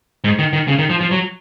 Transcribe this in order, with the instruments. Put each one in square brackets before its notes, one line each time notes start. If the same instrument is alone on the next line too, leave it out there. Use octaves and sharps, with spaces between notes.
[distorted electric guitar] G#2
D#3
D#3
C#3
D#3
F3
F3
F#3